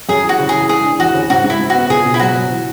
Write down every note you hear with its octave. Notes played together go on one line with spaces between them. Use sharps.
F#2 G#4
E3
F#4
C#3
G#4
E3
G#3 G#4
D4
E2 F#4
C#3
G#2 F#4
G#2
E4
G#2
F#4
B3
C#2 G#4
B2
E4
F#3 F#4
F#3
E3